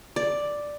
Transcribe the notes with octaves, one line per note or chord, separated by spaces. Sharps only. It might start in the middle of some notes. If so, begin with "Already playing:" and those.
D5